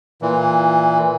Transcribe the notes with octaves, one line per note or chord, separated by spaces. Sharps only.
A#2 E3